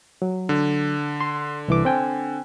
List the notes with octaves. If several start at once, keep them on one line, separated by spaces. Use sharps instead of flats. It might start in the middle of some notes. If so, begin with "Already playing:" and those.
F#3
D3
C6
C2 E3 D6
C4 G5 G#5